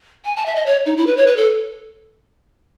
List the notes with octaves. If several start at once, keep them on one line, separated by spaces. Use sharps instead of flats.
G#5
A5
E5
D#5
C#5
D#4
E4
B4
C#5
B4
A4